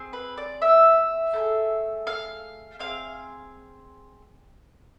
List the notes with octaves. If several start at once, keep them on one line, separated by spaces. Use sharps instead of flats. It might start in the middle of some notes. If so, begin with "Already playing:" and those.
Already playing: C4 G#4
B4
D5
E5
A3 E4 G#4
F5
C4 G#4 F5